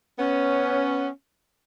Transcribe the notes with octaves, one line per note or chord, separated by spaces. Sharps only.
B3 C#4